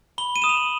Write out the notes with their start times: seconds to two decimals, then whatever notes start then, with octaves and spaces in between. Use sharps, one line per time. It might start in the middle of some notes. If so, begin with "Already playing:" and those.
0.18 B5 G7
0.36 D#7
0.42 D#6 E7
0.49 F7
0.57 F#7